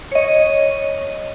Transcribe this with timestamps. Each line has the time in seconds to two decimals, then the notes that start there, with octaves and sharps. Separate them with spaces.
0.12 C#5 D#5